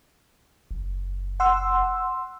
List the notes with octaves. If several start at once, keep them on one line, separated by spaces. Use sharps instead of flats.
F#1
F#5 C6 E6